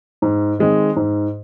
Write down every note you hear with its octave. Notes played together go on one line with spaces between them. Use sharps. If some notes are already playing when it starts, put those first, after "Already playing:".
G#2
D#3 G#3 C4
G#2